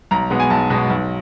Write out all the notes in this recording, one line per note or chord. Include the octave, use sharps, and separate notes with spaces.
B1 A#5
B2 G#3 B3
G#5
B1 A5
B2 G#3 B3
B1